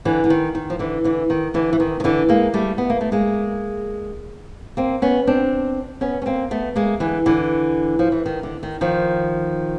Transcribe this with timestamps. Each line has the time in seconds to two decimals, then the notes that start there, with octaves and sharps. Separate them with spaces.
0.05 D3 E3
0.24 D3
0.30 D#3
0.55 D#3
0.70 F3
0.79 D3 E3
1.04 D3 E3
1.30 D#3
1.54 D3 E3
1.73 E3
1.80 D#3
2.00 D#3
2.04 D3 E3
2.29 G#3 A#3
2.54 G3 A3
2.78 B3
2.90 A#3
3.01 A3
3.12 G#3 A#3
4.77 A#3 C4
5.02 B3 C#4
5.27 C4 D4
6.01 B3 C#4
6.22 C#4
6.26 A#3 C4
6.51 A3 B3
6.76 G#3 A#3
7.00 D3 E3
7.26 D3 E3
7.99 F3
8.12 E3
8.26 D#3
8.43 D3
8.63 D#3
8.81 D#3 F3